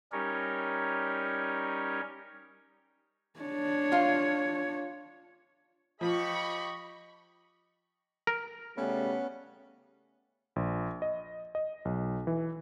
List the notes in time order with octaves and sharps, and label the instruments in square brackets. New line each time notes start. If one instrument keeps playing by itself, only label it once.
[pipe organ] G3 C#4 D#4 G4 A#4 C#5
[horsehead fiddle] D4 C#5
[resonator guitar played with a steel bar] F4 F5
[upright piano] F3 [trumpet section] G4 D#5 [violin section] B5 C#6
[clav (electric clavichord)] A#4
[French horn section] C#3 G3 A3 [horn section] B3 C#4
[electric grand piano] A#1
D#5
D#5
B1
E3